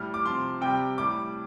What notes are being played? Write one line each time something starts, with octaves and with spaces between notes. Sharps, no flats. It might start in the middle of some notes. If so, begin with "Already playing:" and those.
Already playing: A2 G3 F6
D6
C3 F3 C6
C3 G3 G5
A2 G3 D6